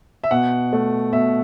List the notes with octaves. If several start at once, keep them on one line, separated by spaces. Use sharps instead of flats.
E5
B2 F#5
A3
B2 E5